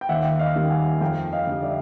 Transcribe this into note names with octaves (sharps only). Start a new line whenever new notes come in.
G5
D#2 E5 F#5
D#5 F5
D#3 G3 A#3
F#5 G#5
F2 F5 G5
D#5 F5
D3 G3
D5 E5